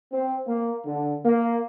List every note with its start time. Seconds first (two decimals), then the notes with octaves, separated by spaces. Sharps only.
0.13 C4
0.46 A#3
0.85 D3
1.24 A#3